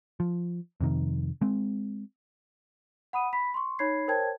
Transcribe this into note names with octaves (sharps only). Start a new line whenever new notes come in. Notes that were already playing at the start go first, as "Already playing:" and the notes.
F3
F2 C3 D#3
G#3 C4
F#5 B5 D#6 D#7
B5 B6
C6 C#6
D#4 C#5 B5 G#6 C7
A#4 C5 C#5 G5 A5 G#6